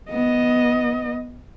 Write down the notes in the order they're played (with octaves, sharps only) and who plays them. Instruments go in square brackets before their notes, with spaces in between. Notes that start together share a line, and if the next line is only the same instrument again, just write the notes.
[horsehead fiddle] B3 D#5